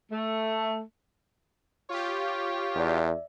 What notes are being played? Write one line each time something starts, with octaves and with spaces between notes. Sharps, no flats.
A3
F4 G4 C#5
E2 D5 E5